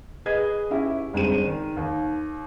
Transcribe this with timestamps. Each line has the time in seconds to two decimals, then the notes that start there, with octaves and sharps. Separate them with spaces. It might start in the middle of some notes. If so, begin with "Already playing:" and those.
0.26 G#4 B4 D#5 G#6
0.70 C#4 E4 G4
1.13 G1 G#3 C4 D#7
1.46 D#3
1.76 D#2